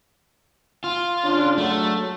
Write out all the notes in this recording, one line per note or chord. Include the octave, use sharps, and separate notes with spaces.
F4
C#3 D4
F#3 A3